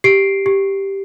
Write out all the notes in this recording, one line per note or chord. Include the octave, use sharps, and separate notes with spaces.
G4 C7 D7
G4